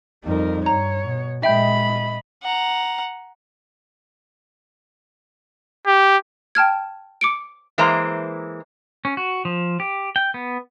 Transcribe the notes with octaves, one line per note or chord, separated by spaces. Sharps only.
F2 G3 D#4 A#4
G2 C#5 A#5
B2
A#2 G#3 D#5 E5 G5 B5 G6
F#5 A#5
G4
G5 A5 F6 G#6
D6 C#7 D7
E3 G#3 A#3 C5 E5 A#5
C#4
F#4
F3
G4
G5
B3